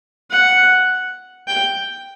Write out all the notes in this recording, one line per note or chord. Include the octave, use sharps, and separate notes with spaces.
F#5
G5